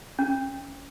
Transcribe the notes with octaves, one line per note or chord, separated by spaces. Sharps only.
C#4